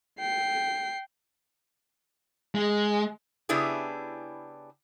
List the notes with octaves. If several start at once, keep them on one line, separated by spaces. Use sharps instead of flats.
G5 C7
G#3
C#3 B3 D4 E4 G4 G#4